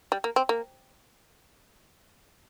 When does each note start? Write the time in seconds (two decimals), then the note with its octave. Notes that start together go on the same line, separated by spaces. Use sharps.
0.12 G3
0.24 A#3
0.36 C4
0.49 A#3